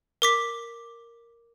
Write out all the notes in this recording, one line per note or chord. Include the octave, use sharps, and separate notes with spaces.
A#4 D6 B6